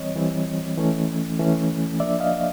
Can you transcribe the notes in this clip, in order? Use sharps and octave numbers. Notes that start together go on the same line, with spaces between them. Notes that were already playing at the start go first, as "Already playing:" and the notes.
Already playing: E3 G3 C4 C#5 D#5
E3 G3 C4
E3 A3 C#4
E3 A3 C#4
F3 A#3 D4 D5 E5
D#5 F5